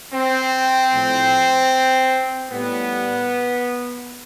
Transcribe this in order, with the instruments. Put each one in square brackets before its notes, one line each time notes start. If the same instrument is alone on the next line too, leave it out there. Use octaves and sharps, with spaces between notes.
[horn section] C4
A2 F3
A2 G3 B3